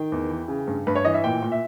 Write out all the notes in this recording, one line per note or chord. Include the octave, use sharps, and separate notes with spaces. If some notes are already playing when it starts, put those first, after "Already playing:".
Already playing: D#3 G5
E2
E3
C#3
G2
G2 B4
C#5
E3 D#5
E5
A#2 G5
A#2
E5